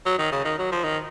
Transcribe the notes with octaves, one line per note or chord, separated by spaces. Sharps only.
F#3
D#3
C#3
D#3
F#3
F3
D#3